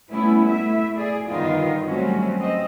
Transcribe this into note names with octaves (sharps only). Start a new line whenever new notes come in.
G3 A3 B3 C#4 E4
A3 E4 E5
G#4 D5
G2 D3 D#3 B3 D#4 F4
F#3 G3 A3 C4 C#4 F#4
C4 D#5